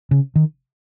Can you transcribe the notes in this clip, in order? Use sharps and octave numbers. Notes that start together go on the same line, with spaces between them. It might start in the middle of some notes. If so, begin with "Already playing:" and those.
C#3
D#3